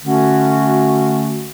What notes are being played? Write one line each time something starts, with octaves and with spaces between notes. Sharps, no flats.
D3 A3 C#4 F#4